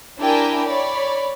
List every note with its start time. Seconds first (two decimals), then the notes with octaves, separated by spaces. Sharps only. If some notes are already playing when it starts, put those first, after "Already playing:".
0.19 D4 E4 G4 A#4 G5 G#5
0.67 C#5 D5 B5